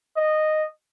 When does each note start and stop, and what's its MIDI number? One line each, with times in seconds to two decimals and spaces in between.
0.17 0.66 75